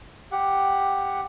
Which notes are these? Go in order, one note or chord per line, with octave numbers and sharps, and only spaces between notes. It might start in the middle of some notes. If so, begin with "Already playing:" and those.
G4 F#5